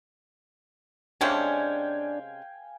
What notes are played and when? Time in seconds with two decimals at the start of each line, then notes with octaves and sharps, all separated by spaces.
1.21 C3 G#3 C#4 D4 F5 G5 G#5